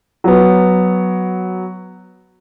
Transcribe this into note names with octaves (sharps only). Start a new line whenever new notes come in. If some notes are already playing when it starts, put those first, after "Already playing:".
F#3 B3